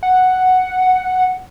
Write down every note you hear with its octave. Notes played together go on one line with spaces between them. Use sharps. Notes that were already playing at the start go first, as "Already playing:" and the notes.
F#5